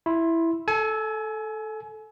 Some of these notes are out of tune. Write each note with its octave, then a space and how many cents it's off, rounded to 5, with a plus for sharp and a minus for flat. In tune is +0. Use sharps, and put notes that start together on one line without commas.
E4 +0 C6 +15
A4 -10 G#5 +30